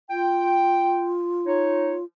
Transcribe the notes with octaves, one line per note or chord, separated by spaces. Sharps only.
F4 G5
D#4 C#5